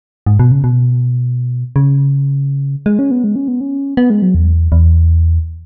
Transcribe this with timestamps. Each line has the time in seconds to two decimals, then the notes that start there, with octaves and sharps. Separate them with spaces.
0.26 G#2
0.39 B2
0.52 C#3
0.64 B2
1.76 C#3
2.86 G#3
2.99 C#4
3.11 B3
3.24 G#3
3.36 C#4
3.48 B3
3.61 C#4
3.97 B3
4.10 G#3
4.22 F#3
4.35 E2
4.72 E2